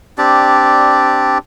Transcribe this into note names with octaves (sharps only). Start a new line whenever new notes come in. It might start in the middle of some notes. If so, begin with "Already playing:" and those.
C4 D4 G4 D5